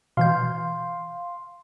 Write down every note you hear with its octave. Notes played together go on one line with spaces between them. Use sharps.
B2 E3 F5 C6 G6